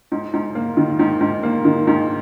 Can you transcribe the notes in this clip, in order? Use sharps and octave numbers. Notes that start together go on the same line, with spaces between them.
G#2
G#2
A#3
D#3
G#2
G#2
A#3
D#3
G#2